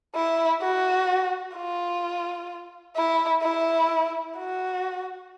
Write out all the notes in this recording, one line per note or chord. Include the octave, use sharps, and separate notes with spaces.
E4
F#4
F4
E4
E4
F#4